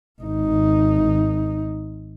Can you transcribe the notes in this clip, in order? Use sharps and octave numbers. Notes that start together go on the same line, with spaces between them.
G#1 D#4